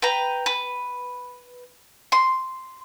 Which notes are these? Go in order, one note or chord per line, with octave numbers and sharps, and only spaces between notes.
B4 G5 A#5
B4
C6